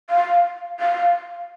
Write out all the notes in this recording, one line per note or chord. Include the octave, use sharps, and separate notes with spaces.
F5
F5